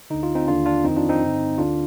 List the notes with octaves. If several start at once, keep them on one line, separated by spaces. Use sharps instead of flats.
D2 D3 D#4
F4
C4 D#4
D#2 D3 D4 F4
D4 F4
F2 D#3 C4 D#4
D4 F4
C4 D#4
G2 D3
D2 D3 D4 F4